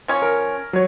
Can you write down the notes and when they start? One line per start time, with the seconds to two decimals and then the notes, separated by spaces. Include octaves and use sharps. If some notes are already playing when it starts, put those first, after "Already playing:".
0.08 F3 C#4
0.22 A#4
0.73 F#3 C#5